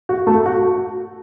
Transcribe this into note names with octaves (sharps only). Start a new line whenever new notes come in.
F#4
A3 A4
F#4